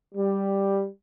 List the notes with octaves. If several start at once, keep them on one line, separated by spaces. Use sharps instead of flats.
G3